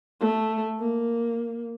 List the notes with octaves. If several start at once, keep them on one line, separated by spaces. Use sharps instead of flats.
A3
A#3